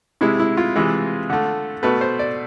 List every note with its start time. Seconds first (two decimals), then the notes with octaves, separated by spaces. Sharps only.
0.21 C3 G#3 E4
0.40 E4
0.57 F4
0.76 C3 E3 G#3
1.30 D3 A3
1.83 B2 A3 B4
2.01 C5
2.19 D5